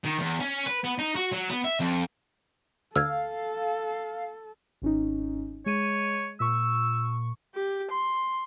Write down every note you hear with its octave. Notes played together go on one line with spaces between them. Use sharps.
D#3
E2
C#4
B4
B3
D#4
F#4
F#3
B3
E5
F2
D2 A4 F5 E6 F6 G#6
G#1 C#4 D#4
G#3 C#5 D#7
A#2 C#6 E6
G4
C6